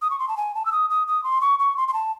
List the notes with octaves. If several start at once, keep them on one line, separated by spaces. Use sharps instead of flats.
D#6
C#6
C6
A5
G#5
A5
E6
D#6
D#6
D#6
C6
C#6
C#6
C6
C6
A5